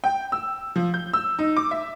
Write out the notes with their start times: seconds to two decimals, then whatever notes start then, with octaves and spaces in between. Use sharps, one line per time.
0.04 G5
0.32 E6
0.76 F3
0.94 G6
1.13 E6
1.39 D#4
1.57 D6
1.71 E5